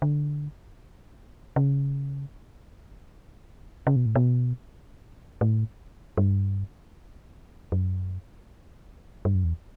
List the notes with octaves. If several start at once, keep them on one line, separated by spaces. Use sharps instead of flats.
D3
C#3
C#3
B2
A2
B2
A2
G2
F#2
G2
F#2
E2